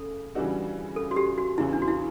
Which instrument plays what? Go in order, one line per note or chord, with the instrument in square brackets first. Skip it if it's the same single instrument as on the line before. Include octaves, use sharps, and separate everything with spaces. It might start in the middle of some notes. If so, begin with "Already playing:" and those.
Already playing: [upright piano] C#3 [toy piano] A4
[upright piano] C#3 E3 G3 D4 F#4
[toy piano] A4
F#4
G4
F#4
[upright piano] E2 C#3 E3 [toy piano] E4
[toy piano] D4
F#4
E4